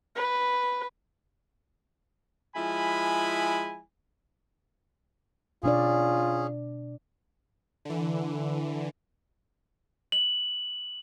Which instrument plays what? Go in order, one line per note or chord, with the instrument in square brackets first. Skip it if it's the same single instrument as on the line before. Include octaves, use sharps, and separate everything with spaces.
[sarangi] B4
[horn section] F3 G#3 E4 G#5 B5
[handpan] B2 D4 D5 [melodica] C#4 G#4 [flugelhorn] F4
[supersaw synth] D3 E3
[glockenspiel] F#7